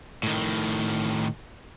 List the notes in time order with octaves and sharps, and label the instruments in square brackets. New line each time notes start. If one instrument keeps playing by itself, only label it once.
[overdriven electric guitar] A2 D#3